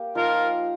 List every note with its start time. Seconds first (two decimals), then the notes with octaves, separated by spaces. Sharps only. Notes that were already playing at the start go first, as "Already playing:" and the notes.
Already playing: A#3 G4
0.15 F3 D#4 F4 A#4 C5